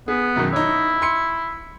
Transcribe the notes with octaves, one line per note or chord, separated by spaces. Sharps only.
B3 G#4
F#2 B2 D#3
D#4 E4 C#5
C6 C#7